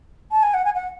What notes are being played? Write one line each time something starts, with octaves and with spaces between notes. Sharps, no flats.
A5
G#5
F#5
G#5
F#5